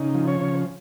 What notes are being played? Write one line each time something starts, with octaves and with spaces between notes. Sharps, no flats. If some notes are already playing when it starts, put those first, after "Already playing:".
Already playing: C#3 D#4
F3
C#5
C#3